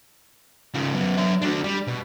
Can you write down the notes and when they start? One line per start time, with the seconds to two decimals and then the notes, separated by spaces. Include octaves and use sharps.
0.74 C#3 F3
0.94 F#2 B3
1.18 F#3 E5
1.43 D4 F#4
1.64 G3
1.87 B2